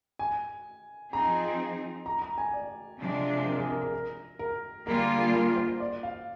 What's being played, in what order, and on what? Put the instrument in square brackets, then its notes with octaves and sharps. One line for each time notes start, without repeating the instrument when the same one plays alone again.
[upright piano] G#5
[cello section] F3 C4 D#4 G#4 [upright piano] A#5
[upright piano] A#5
A#5
G#5
D5
[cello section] C3 F3 G#3 D4
[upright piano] A#4
G#4
A#4
A#4
A#4
A#4
[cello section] D3 G3 A#3 F4 G#4 [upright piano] A#4
[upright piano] A#4
C5
D5
F5